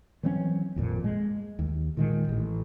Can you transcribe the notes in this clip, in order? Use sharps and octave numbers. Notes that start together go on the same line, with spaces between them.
E3 F#3 C4 C#4
G#1 F2 A#2
G#3
D#2
A#2 D#3 G#3
A1